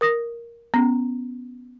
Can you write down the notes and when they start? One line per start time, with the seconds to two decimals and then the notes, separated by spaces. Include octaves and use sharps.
0.01 A#4 D#6 A#6
0.74 B3 C#4